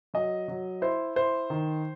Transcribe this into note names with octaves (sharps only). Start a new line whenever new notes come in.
F#3 D#5
F#3
E4 C5
E4 C5
D#3